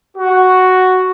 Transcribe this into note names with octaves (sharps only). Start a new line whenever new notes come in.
F#4